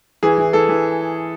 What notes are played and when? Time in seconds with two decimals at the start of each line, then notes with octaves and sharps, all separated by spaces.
0.23 E3 G#4
0.38 E3
0.53 E3 A4
0.69 E3